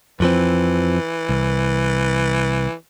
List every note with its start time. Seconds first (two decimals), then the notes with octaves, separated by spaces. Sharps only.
0.20 F2 E3 F3 C4
1.29 C2